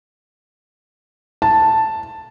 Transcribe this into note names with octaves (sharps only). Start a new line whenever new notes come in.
A5